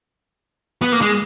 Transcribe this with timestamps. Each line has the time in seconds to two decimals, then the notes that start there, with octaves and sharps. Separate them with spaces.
0.82 B3
0.92 A#3
1.01 G#3